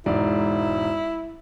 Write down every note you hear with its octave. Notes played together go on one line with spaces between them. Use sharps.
E1 G#2 E4 D5